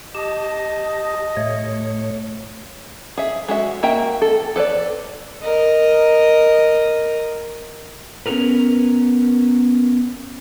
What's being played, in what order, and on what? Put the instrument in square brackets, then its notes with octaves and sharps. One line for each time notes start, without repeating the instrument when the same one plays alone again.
[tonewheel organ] G4 A5 [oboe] D#5
[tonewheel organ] A2 A3 C#5
[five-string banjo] G#4 E5
G#3 F#4 E5
A#3 F#4 E5 G5
A4
A4 B4 C5 D5
[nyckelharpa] A#4 D#5
[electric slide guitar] B3 C#4 F#4 G#4 A#4 B4